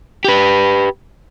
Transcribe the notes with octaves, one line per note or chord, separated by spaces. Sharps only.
G4 B4